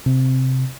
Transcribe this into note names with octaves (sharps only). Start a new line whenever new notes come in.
C3